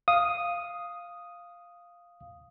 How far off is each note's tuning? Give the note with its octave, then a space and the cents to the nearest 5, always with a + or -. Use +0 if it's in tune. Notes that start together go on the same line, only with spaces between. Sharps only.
F5 +0 D#6 +0